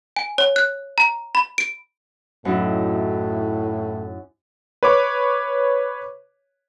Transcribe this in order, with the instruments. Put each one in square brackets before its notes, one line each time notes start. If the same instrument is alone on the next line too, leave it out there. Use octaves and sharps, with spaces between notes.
[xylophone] G#5
C#5
F#6
A#5
B5
D7
[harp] F#2 D#4 E4 [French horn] A2
[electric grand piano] B4 C#5 D6